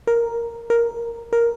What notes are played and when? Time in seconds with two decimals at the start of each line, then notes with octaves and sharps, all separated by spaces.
0.07 A#4
0.70 A#4
1.33 A#4